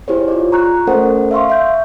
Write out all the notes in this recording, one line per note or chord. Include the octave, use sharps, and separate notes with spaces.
E4 G4 G#4 C5 C#5
F4 D5
A#5 C#6 F#6
A3 C#4 A4 A#4 C5 F#5
E5 F5 C6 C#6
E5 G6